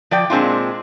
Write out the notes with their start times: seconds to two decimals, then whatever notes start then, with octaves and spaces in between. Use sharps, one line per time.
0.11 F3 D5 G5
0.30 A#2 G#3 C4 D4 D#4 F4